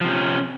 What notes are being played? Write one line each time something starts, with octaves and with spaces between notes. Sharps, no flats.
C3 F3 C#4